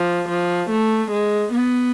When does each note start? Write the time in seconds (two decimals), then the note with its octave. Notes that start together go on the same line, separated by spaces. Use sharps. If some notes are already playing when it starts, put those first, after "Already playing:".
Already playing: F3
0.29 F3
0.70 A3
1.12 G#3
1.53 B3